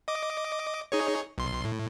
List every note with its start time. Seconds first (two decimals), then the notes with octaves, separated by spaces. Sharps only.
0.08 D#5 D6
0.92 D#4 G#4 C#5
1.38 B1 C6
1.65 A2